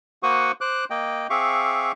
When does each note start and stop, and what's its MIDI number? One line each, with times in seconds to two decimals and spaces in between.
0.23 0.52 58
0.23 0.52 66
0.23 0.52 72
0.23 0.52 78
0.23 0.52 85
0.23 0.52 87
0.61 0.85 72
0.61 0.85 86
0.61 0.85 90
0.90 1.27 58
0.90 1.27 75
0.90 1.27 79
1.30 1.92 60
1.30 1.92 68
1.30 1.92 76
1.30 1.92 77
1.30 1.92 85
1.30 1.92 86